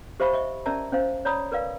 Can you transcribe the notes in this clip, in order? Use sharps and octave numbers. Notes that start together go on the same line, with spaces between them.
G4 C5 E5 F5 B5 C#6
D#5 E5 C#6
C#4 A#4 D5 E5 A5 A#5
C#4 C5 F5
C#5 D5 A#5 B5 D#6
A#4 B4 D5 F5